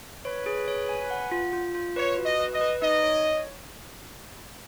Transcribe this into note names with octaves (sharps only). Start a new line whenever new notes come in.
B4 C#5
G#4
C#5
G#5
F#5
F4
F4
F4
B4 C#5
F#4
D#5
B4
D#5
B4
D#4 D#5
C#5